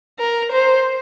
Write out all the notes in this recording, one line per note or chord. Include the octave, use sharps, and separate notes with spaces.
A#4
C5